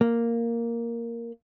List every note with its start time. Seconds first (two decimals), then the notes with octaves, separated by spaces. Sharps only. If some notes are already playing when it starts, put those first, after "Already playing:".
0.01 A#3